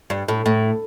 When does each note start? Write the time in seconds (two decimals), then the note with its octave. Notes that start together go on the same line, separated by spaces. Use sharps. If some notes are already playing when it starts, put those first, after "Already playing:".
0.10 G2
0.28 A2
0.46 A2